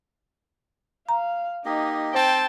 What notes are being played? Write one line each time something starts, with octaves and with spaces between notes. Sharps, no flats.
F5 A#5
A#3 D#4 G4 D#5
C4 C5 G5 A5